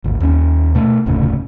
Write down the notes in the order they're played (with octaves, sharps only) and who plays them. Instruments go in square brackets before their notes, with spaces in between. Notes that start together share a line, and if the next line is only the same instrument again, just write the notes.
[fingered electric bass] G#1 D2
D#2 C#4
B2 A3
F1 D2 A2 C#3